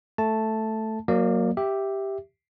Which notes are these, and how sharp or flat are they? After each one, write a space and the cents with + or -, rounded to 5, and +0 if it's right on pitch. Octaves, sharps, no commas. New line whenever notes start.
A3 +0 A5 +0
F#3 -10 A#3 +0 D5 +35
G4 +0 E5 +0